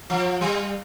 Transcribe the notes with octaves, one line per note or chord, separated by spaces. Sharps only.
F3
G3